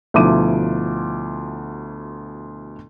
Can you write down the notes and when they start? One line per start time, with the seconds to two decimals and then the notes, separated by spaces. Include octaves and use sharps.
0.14 D2 B2 F3 E4 D6 D#7